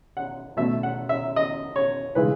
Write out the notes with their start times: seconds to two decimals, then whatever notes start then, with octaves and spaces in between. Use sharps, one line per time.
0.17 F#5
0.57 B2 A3 E5
0.83 F#5
1.09 E5
1.36 D#5
1.76 C#5
2.15 C#3 E3 G#3 B4